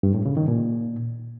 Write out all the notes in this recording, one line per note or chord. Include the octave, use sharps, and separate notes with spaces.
G2
A2
C#3
D#3
A#2